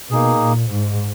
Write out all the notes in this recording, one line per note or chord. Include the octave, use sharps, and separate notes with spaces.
B2 A#3 D#4 G#4
A#2
G#2